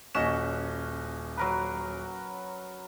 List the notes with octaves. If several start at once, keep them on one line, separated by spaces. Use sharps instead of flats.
D#1 C#4 F#4 D#5 E7
F#3 A#4 B4